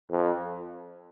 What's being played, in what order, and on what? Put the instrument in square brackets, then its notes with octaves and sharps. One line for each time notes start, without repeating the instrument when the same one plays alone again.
[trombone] F2